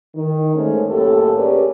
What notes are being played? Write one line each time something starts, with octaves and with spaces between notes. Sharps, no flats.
D#3
G#2 A3 C#4
F#2 A2 A#3 G4 A4
C#4 G4 G#4 A#4 B4 D5